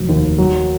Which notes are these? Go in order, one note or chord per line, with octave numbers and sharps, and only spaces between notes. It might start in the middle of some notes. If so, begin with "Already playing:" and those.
Already playing: F1 D#3 F#3
D#2
F#3